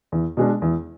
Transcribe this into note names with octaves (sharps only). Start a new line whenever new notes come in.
E2
B2 G#3 D4
E2